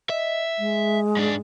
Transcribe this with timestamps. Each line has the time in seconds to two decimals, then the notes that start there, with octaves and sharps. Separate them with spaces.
0.10 D#5 E5
0.58 G#3
1.17 G#2 D4